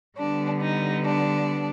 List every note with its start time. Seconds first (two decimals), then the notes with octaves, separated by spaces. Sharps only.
0.18 D3 G3 B3 D4
0.62 D#4
1.05 D4